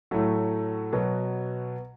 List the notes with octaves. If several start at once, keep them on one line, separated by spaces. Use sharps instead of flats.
A2 F#3 A3
B2 F#3 B3